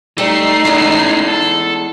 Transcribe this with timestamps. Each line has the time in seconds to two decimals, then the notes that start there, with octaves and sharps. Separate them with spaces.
0.18 G3 A3 D#4 C7
0.65 E2 G#3 A3 C#4
1.28 A4